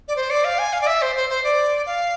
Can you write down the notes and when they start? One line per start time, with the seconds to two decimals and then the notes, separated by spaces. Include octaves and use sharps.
0.08 D5
0.16 C5
0.30 D5
0.45 F5
0.59 G#5
0.73 F5
0.81 D5
0.87 E5
1.02 C5
1.15 C5
1.29 C5
1.44 D5
1.86 F5